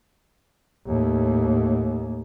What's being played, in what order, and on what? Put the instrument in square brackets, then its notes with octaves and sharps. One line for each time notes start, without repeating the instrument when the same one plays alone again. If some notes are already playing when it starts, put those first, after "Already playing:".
[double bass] D#2 A2